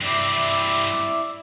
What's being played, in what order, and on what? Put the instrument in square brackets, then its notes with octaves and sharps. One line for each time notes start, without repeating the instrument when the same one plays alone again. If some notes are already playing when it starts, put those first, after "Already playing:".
[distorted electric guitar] G2 C4 [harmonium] E4 D5 E5